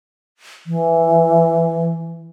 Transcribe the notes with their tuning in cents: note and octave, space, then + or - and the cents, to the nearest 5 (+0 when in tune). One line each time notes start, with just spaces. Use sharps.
E3 +10